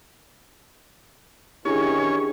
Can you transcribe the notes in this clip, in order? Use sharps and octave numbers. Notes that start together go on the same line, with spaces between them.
D#3 E3 C#4 D4 E4 G4 G#4 C#5